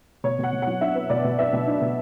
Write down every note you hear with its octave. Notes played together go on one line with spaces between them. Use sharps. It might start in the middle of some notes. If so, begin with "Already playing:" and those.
B2 C#5
B2 F#5
B2
F#3 F#5
D4 E5
B3
B2 D5
B2
B3 E5
B2
D4
B2